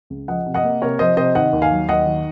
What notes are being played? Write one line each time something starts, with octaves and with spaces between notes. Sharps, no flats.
C#2
F3 D#5 F#5
C3
D#5 F#5
A#3
C3 A#4 C#5
F3 C5 D#5
C3 C5 D#5
D#3 D#5 F#5
D#2
F5 G#5
F#3
D#2 D#5 F#5
D#3